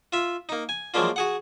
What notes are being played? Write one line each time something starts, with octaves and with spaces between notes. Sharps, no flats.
F4 E5
A#3 D#4
G#5
F3 F#3 G#3 A#3 D4 F4
F#4 G#4 F#5